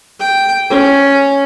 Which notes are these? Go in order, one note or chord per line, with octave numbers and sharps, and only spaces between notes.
G5
C#4